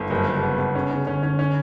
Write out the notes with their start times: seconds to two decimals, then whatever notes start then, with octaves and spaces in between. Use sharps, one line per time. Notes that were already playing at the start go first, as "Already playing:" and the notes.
Already playing: G1
0.10 F#1 C#3
0.27 F#1
0.42 B3
0.58 B3
0.75 C#4
0.91 C#4
1.07 D3 C#4
1.23 C#4
1.39 C#4